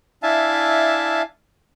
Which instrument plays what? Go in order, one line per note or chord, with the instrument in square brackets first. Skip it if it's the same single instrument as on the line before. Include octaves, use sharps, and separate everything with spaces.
[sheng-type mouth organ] D4 E4 E5 F5 G#5 A5